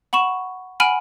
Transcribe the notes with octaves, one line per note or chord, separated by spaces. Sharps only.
F#5 B5 C#6 E7
F#5 G#5 B5 F6 D7 D#7